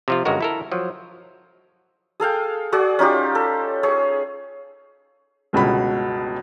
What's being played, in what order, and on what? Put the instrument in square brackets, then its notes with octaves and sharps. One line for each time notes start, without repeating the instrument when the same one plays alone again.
[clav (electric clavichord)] C3 F3 F4
G1 G2 G#3 C#4 F#4 A#4
E4 A4 A#4
F3 F#3
[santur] G#4 A4 F5 G5
F#4 G#4 D5 F#5
C#4 D#4 F4 G4
A4
G#4 C#5
[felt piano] G1 C#2 B2 B5